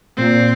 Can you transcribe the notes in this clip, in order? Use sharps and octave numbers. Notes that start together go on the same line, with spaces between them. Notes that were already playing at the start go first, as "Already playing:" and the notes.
A#2 C4